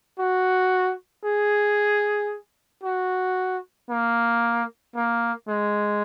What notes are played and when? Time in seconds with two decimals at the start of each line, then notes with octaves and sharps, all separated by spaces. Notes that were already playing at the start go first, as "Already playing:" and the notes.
0.19 F#4
1.25 G#4
2.84 F#4
3.90 A#3
4.95 A#3
5.48 G#3